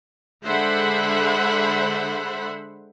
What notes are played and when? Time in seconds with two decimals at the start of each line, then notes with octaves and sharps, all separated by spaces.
0.44 D3 G#3 C5 E5 F#5 B5